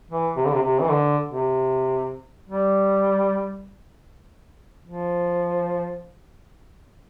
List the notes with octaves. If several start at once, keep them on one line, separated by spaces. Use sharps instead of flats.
E3
C3
D3
C3
C3
E3
D3
C3
G3
F3